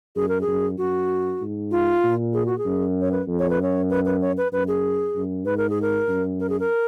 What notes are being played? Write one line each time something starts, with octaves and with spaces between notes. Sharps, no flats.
F#2 G#4
A#4
G#4
F#2
F#2 F#4
G#2
F4
A#2
G#4
F#4
G#4
F#2
C#5
B4
F2
C#5
B4
F#2 C#5
B4
B4
C#5
B4
F#2 B4
G#4
F#2
G#2 B4
A#4
G#4
A#4
F#2
A#4
G#4
A#4